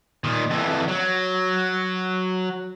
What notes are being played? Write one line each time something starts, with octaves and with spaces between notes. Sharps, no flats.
A#2 D#3
F2 E3
F#3